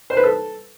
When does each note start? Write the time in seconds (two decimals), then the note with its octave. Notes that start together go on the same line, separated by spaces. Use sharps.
0.10 C5
0.17 B4
0.24 A4